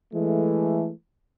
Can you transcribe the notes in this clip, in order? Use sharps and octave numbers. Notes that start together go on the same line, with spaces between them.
E3 G#3 A3